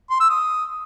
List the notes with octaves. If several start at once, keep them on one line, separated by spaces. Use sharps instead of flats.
C6
E6
D#6